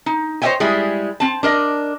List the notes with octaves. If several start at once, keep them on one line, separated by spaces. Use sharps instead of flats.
D#4
C5 C#5 D#5 E5 G5 G#5
G3 G#3 E4 G#4
C4 A5
D4 A#4 D#5